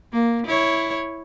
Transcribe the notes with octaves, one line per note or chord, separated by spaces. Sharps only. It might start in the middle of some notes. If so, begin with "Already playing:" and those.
A#3
E4 C#5